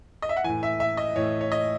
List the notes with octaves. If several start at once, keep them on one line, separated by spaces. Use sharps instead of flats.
D#5
E5
F#5
A2 E3 G#5
E5
E5
D#5
A2 E3 C#5
C#5
D#5